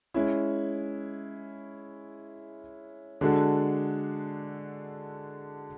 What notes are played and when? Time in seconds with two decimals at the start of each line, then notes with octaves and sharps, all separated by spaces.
0.14 G#3 C#4 E4
3.21 D3 G#3 D4 F#4 A4